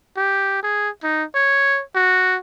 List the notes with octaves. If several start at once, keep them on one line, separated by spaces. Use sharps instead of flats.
G4
G#4
D#4
C#5
F#4